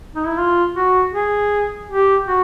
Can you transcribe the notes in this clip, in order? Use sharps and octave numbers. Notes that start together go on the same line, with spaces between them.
D#4
E4
F4
F#4
G#4
G4
F#4